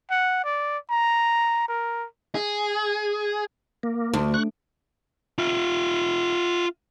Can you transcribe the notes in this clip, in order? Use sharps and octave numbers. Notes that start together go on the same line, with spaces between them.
F#5
D5
A#5
A#4
G#4
A#3
D2
C#6 F#6
F4 E5